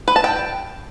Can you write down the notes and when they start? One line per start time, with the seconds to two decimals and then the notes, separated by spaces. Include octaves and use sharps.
0.08 B4
0.16 A5
0.24 G5